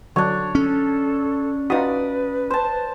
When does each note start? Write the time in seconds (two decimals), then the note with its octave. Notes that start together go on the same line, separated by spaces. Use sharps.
0.16 D3 F#3 D4 C#5
0.55 C#4 A4
1.70 D#4 F4 F#4 B4 D5 D#6
2.50 C5 A5